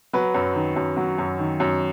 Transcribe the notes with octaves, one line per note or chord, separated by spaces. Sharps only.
F#3 B4
F#2
D#3
F#2
F#3
F#2
D#3
F#2